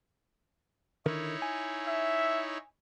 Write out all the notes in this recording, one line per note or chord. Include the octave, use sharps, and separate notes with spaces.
D3 D#3 D#4 E4 A#4 C#5
G#5
E5